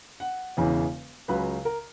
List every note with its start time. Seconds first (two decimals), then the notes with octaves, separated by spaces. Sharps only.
0.20 F#5
0.57 E1 E2 C#3 E3
1.28 C#2 C#3 F#3 B4
1.65 A#4